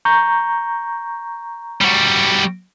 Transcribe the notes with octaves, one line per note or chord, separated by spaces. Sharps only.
A#5 C#6 G6
G3 F#4